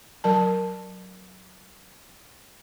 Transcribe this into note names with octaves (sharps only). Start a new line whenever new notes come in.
F#3 A#4 A5